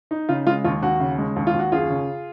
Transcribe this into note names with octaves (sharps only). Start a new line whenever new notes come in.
D#4
C#3 F4
G#3 F4
D#2 F4
D#2 F#4
C#3
G#3
D#2
F4
D#2
F#4
F#2 F4 G#4
C#3